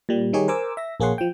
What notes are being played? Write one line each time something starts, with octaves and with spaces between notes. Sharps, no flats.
A#2 G3
D#3 G3 D#4 G4 G#4 C#5
A#4 C5 G#5 D6 E6
E5 A#6
A#1 A#3 G#4 C#5 F#5 C6
F3 G5